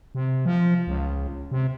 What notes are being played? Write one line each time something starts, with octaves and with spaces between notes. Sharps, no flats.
C3
F3
C#2
C3